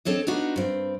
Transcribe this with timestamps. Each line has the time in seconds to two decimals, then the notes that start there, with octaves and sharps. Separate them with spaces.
0.05 C4 D4 A4 C#5 D#5
0.27 B3 D4 D#4 F4 F#4
0.56 G2 C4